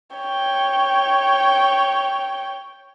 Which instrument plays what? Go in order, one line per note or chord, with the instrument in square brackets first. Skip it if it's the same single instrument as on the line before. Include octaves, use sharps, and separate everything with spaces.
[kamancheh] C#5 G5